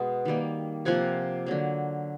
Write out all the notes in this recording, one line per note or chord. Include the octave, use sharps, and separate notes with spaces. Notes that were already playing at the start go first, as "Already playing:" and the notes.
Already playing: B2 G#3 B3 F#5
D#3 G3 A#3
C3 F3 A#3 F#5 G#5
D3 F#3 A#3